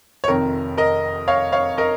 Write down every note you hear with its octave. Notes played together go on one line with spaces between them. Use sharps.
C#5
F1 F2 D#3 A#4
A#4 D#5
C#5 F5
C#5 F5
A#4 D#5